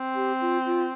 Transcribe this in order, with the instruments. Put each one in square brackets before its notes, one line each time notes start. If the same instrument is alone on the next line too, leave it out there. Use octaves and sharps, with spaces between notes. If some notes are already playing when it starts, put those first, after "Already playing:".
Already playing: [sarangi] C4
[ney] G4
F4
F4